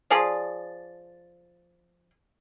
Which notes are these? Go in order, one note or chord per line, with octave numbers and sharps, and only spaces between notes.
F3 G#4 D5